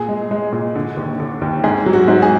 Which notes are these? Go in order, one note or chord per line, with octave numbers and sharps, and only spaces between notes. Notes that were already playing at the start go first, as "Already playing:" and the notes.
Already playing: A#2 G#4
G#3
G#3
A#2
D3
D#2
D3
D#2
G#2 G#4
F#3
F#4
G#2
G#4